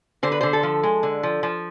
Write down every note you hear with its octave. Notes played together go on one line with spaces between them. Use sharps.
D3 C5
B4
D3 C5
A4
F3
G#3
D3
F3
F3